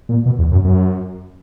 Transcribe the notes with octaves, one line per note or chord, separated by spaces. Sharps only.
A#2
B2
E2
F#2
F#2